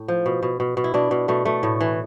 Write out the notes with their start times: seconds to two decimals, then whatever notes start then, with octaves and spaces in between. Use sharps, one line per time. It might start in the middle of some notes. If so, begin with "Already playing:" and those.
Already playing: A2
0.08 F3
0.26 B2
0.43 B2
0.60 B2
0.77 B2
0.84 E4
0.94 B2 D4
1.11 B2
1.28 B2 A3
1.45 B2 A3
1.63 A2
1.81 E3